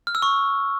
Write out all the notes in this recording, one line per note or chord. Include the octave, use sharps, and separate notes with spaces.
F6
E6
C#6